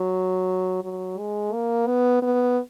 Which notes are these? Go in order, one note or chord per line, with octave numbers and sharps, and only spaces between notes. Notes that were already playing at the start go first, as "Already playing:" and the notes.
Already playing: F#3
F#3
G#3
A#3
B3
B3